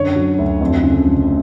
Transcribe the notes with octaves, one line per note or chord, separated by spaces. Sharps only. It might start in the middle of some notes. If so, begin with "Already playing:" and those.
Already playing: F#2 D3 C#5
F#3
D2
F2
C#3
F1